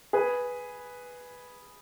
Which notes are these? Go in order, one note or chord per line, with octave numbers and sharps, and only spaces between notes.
G#4 B4